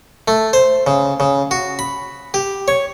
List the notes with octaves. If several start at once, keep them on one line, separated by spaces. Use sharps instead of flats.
A3
C5
C#3
C#3
F#4
B5
G4
C#5